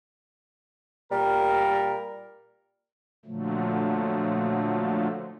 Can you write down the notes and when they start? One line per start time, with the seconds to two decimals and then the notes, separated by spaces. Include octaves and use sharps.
1.12 A#2 G3 A#4
3.25 A#2 D3 F3 F#3 A3